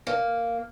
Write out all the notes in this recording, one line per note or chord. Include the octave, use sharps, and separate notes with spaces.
A#3